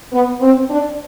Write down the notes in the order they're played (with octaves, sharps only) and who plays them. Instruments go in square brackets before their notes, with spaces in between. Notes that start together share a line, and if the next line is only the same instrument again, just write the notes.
[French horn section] B3
C4
D4